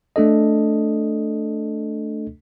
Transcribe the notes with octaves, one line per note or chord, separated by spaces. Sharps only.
A3 D4 A4 D#5